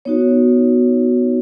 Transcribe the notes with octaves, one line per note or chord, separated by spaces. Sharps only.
B3 D#4 F#4 C#5